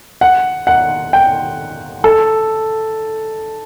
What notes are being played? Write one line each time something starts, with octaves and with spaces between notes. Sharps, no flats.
F#5
F#5
G5
A4